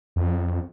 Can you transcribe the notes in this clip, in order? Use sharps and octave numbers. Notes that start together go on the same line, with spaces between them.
F2